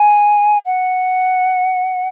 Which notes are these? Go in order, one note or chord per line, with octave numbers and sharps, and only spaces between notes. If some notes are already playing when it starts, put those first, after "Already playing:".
Already playing: G#5
F#5